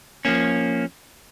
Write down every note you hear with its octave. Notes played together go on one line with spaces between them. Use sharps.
F3 A#3 C#4